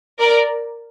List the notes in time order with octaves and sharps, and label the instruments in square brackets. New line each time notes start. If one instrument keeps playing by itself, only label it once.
[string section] A#4 D5